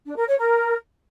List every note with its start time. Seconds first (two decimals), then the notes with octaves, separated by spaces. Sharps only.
0.05 D4
0.16 A#4
0.27 C#5
0.38 A#4